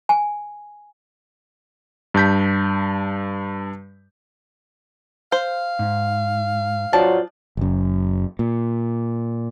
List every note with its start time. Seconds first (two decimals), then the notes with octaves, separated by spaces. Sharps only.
0.09 G#5
2.14 G2 A5 G6 B6
5.32 C5 F5
5.79 G#2
6.93 F#3 F4 C5 D5 A5
7.57 F#1 F#2
8.39 A#2